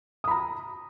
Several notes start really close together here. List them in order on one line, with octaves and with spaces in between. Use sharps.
D#6 B5 A#5